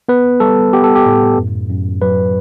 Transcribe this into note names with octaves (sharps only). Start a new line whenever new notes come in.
B3 B4
G3 A4
B3 G4
A4
G4
A2
F#2
F#2
F#3 B4